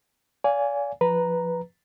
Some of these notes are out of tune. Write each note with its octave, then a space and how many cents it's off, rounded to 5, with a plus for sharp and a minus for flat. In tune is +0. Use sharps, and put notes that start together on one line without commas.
D5 -40 F5 +0 G#5 -5
F3 +0 B4 +0 A#5 +0